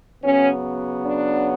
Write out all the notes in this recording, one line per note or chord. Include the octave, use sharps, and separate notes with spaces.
C#3 F#3 B3 C#4
D4